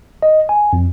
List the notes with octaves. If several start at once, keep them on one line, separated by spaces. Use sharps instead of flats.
D#5
G#5
F2